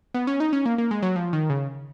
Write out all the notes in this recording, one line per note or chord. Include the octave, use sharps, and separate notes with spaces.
B3
C#4
D#4
C#4
A#3
A#3
G#3
F#3
F3
D#3
C#3